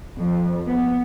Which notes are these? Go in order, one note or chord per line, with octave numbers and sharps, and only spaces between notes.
F2
B3